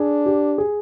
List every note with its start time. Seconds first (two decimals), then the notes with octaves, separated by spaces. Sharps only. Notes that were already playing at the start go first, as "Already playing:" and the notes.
Already playing: D4 G#4
0.26 G4
0.58 G#4